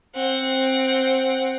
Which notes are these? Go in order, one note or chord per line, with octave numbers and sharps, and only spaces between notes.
C4 F#5